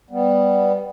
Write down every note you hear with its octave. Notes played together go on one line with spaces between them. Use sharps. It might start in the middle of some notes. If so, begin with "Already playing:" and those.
G3 B3